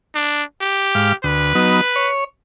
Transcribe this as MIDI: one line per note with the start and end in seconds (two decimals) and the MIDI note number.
0.15 0.44 62
0.61 1.13 67
0.95 1.13 44
0.95 1.13 77
1.24 1.53 38
1.24 2.11 71
1.55 1.81 54
1.55 1.81 59
1.55 1.81 63
1.96 2.24 73